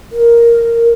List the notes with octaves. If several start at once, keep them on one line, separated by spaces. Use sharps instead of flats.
A#4